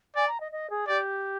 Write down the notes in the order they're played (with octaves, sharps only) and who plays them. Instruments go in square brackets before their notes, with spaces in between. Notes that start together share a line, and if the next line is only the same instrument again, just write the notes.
[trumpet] D5 [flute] G#5
[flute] A#5
D#5
D#5
G#4
[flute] G4 [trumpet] D5